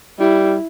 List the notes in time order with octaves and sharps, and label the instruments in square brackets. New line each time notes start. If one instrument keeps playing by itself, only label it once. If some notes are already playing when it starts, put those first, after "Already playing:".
[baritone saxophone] G3 [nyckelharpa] E4